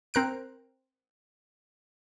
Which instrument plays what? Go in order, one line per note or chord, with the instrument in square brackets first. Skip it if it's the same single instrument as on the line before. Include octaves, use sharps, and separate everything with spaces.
[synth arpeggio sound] C4 A#4 F#6 D7